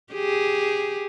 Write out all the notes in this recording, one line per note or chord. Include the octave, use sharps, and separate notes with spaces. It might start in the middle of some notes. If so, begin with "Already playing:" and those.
G4 G#4